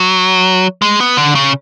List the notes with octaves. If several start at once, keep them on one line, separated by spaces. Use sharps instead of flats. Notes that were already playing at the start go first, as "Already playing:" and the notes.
Already playing: F#3
G#3
B3
D3
C#3